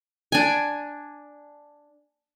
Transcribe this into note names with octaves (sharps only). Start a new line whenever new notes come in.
D4 G#5